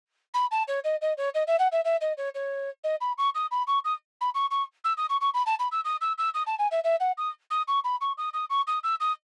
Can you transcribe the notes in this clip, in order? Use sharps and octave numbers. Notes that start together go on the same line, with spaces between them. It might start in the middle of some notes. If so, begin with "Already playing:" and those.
B5
A5
C#5
D#5
D#5
C#5
D#5
E5
F#5
E5
E5
D#5
C#5
C#5
D#5
B5
C#6
D#6
B5
C#6
D#6
B5
C#6
C#6
E6
D#6
C#6
C#6
B5
A5
B5
E6
D#6
E6
E6
D#6
A5
G#5
E5
E5
F#5
D#6
D#6
C#6
B5
C#6
D#6
D#6
C#6
D#6
E6
D#6